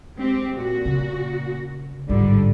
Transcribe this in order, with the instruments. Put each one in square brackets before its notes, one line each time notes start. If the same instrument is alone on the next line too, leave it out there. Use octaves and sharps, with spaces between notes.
[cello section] G#3 C4 G4
A#2 F#4
[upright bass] C#3
[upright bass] A1 F4 [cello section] G#2 D3 G3